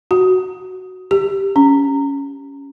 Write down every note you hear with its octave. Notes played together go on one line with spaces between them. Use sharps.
F#4
G4
C#4